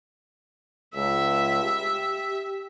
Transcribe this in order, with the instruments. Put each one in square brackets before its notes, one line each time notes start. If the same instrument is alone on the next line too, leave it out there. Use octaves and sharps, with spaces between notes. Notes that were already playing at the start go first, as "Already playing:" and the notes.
[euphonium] C#2 [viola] E5
[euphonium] G4